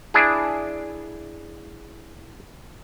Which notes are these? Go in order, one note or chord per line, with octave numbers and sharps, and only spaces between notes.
D4 E4 G#4